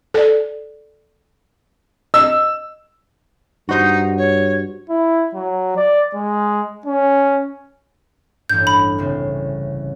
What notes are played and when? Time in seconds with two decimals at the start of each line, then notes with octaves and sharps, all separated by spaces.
0.14 A4 D5
2.14 D#5 E6
3.69 G2 D#4 F#4 C5
4.18 C#5
4.90 E4
5.35 F#3
5.76 D5
6.14 G#3
6.86 C#4
8.49 A1 G2 G6
8.67 B5
8.98 C2 C#3 C4